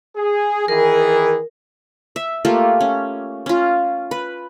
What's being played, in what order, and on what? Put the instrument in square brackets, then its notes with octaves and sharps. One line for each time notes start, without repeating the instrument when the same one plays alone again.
[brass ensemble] G#4
[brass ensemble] D#3 E3 G#4 [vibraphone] A#4
[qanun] E5
A3 A#3 F4 G4
C#4
C#4 F4
B4